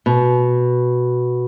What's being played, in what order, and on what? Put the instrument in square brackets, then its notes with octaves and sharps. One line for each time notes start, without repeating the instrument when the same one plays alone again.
[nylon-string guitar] B2